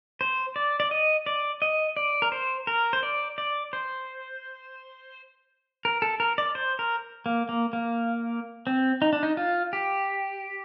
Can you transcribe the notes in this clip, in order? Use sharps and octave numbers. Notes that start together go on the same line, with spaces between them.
C5
D5
D5
D#5
D5
D#5
D5
A#4
C5
A#4
C5
D5
D5
C5
A#4
A4
A#4
D5
C5
A#4
A#3
A#3
A#3
C4
D#4
D4
D#4
F4
G4